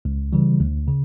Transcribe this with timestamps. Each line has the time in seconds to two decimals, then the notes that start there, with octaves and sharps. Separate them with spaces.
0.05 C#2
0.33 C#3 E3 G3
0.60 D2
0.88 C#3